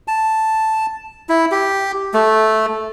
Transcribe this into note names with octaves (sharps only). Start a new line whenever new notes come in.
A5
E4
G4
A3